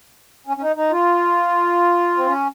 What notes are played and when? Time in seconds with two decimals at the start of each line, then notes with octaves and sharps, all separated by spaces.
0.47 C#4
0.57 C#4
0.61 D#4
0.76 D#4
0.91 F4
2.17 C4
2.27 C#4